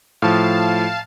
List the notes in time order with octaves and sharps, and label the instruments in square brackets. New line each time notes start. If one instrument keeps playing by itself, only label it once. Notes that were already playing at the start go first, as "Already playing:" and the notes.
[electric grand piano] A2 F3 [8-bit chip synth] F5 A5